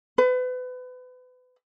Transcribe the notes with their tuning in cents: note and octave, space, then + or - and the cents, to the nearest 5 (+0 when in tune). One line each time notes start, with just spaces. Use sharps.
B4 +30